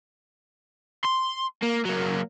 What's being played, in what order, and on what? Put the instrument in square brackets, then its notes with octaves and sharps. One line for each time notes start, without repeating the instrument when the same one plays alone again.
[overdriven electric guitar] C6
A#3
F#3 A#3